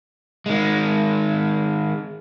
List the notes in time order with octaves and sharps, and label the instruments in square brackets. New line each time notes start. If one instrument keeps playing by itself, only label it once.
[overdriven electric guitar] D#3 G#3